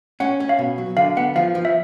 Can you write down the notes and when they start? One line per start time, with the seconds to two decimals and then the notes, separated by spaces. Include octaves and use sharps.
0.20 C#4 F#5
0.40 C#4
0.49 F5
0.59 B2
0.78 F#3
0.97 D3 F5
1.17 B3 F#5
1.36 F3 F5
1.55 F3
1.65 E5